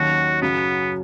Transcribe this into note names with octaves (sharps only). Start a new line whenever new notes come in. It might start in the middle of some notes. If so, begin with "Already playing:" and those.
Already playing: D#2 D#3 F#3 C#4 F#4
F#2 C#3 F#3 B3